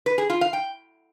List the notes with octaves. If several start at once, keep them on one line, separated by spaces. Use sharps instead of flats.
B4
G#4
F4
F5
G5